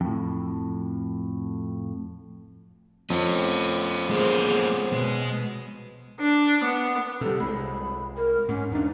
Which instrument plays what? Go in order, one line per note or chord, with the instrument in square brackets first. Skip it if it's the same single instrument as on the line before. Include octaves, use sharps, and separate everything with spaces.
[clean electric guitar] F2 A2
[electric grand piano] F2 [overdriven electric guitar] B3 C#4
[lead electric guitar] G#3 A#3 [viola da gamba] G#4 C5
[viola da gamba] B2 [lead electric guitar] G#3
[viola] D4
B3
[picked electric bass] C3 G3 [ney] A4
[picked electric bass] C2 G#3 [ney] B5
[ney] A#4
[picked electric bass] G#2 [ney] C#4
[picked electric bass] E2 D4 [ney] D#4